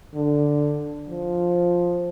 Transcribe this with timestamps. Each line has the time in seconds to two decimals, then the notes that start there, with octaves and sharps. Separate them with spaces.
0.15 D3
1.09 F3